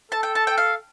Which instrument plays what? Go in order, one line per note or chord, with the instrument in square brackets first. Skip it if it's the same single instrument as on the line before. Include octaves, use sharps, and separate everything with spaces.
[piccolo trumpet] A4 [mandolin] A5
[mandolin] G5
A5
G5
F5